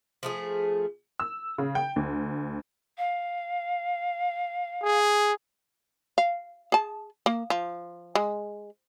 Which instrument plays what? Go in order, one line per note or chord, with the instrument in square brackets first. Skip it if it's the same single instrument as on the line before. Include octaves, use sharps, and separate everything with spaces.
[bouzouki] F3 A3 G#4
[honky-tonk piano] E6
C#3
G5
D2
[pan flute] F5
[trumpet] G#4
[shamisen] F5
G#4 A5
A#3
F3
G#3